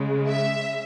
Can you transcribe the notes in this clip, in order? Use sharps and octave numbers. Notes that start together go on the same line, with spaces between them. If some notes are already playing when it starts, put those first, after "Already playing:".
Already playing: C#3 G#3
E5